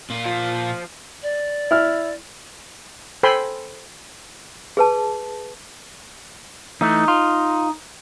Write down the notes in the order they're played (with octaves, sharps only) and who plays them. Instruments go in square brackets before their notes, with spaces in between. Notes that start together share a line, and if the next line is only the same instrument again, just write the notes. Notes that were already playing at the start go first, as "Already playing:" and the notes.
[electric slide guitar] A#2 F4
[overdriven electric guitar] F3
[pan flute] D5
[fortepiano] E4 F6
[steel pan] A4 C5 G5 G#5 B5 C6
[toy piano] G#4 B4 A5
[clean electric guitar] E3 A3 [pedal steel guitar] D#4
[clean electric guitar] F4